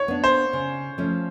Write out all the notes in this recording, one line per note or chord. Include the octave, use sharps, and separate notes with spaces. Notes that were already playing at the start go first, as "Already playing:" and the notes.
Already playing: C#5
B3 D4
C5
C#3
F3 A3 C#4